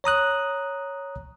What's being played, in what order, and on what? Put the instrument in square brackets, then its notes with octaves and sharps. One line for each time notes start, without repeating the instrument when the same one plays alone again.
[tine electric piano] C#5 A#5 D#6 F#6